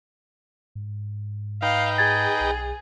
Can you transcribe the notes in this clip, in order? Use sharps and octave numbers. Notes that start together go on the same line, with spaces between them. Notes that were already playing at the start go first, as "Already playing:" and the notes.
G#2
G#2 D#4 B4 F5 G5
G#4 G#6 A6
B1